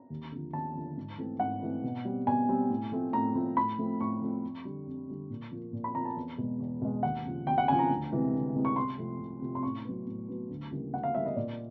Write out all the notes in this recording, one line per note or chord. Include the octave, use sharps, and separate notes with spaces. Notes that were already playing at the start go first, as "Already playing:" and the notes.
Already playing: A#5
D#2
D3 F3
D#2 A5
D3 F3
G#2
E3 A3 C4
G#2 F#5
E3 A3 C4
B2
G3 C4
B2 G#5
G3 C4
A2
F3 A3 C4
A2 A#5
F3 A3 C4
A2 B5
F3 A3 C4
A2 C#6
F3 A3 C4
F2
D3 G3
F2
D3 G3
A#2
F3 A#3
A#2
B5
F3 A#3 A#5
A5
E2
B2 G#3
E2
B2 G#3
D#2 F#5
C#3 F3
D#2 G5
F#5
C#3 F3 G#5
A#5
D2
C3 E3 G#3 C4
D2
C3 E3 G#3 C4
C#6
C2 C6
C3 F3 A3 C4
C2
C3 F3 A3 C4
C6
A2 C#6
F#3 B3
A2
F#3 B3
D2
C#3 E3 G3 A#3
D2 F#5
F5
C#3 E3 G3 A#3 E5
D#5
A#2 D5